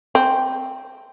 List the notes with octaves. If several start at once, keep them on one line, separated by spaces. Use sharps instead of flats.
C4